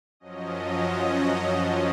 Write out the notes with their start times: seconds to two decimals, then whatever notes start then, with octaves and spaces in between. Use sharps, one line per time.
0.20 F#2 F3 F#3 C#4 D#5